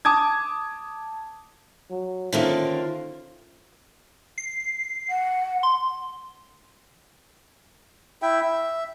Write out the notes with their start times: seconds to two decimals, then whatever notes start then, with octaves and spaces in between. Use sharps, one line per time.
0.05 A5 D6 D#6 G#6
1.90 F#3
2.33 D3 D#3 A#3 C#4 F4 C5 E5
4.38 C7
5.10 F#5
5.63 C6
8.22 E4 E5 G5
8.41 E5